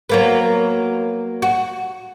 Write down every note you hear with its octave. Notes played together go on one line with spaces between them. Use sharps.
F#3 A#3 B3
F#4